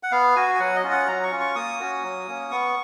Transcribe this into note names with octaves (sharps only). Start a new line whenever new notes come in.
F#5
B3 F5
F#4 G#5
G#5
F#3 F#5
D#5
C#4 F4
F#5
F#3 A#5
C#6
C#4 F4
C#6
A#3 D#6
C#4 F#4
F#3
A#3 C#4
B3 C#6